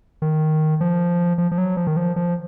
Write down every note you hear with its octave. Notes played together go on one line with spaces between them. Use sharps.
D#3
F3
F3
F3
F#3
F3
D#3
F3
F3